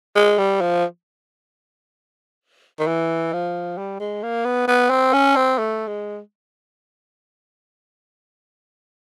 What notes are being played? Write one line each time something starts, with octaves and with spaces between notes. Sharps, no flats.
G#3
G3
F3
D#3
E3
F3
G3
G#3
A#3
B3
B3
C4
C#4
C4
A3
G#3